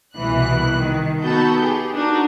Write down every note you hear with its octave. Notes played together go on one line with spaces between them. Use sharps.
C2 B2 E3 F#6
D#3
B3 D#4 F#4 A4 A5 G6
G4 G#4
D4 D#4 F#4 A#4